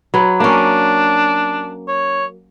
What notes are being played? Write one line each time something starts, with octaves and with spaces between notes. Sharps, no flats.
F#3 B4
A#3 C#4 D4
C#5